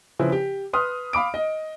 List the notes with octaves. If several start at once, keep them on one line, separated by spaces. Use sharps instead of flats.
C#3 F3 C4 E4 B4
G4
B4 C6 D#6 F6
F5 B5 D6 D7
D#5